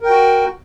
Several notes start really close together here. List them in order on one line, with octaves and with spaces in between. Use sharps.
A#4 G5 F#4